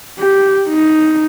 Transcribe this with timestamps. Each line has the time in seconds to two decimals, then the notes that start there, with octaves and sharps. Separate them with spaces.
0.19 G4
0.69 D#4